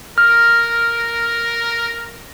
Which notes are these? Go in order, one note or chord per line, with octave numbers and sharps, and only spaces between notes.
A#4 F6